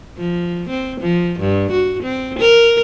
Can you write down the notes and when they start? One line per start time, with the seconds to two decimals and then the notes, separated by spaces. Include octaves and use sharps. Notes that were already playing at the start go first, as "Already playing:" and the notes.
0.17 F3
0.70 C4
1.01 F3
1.40 G2
1.72 F#4
2.03 C4
2.39 A#4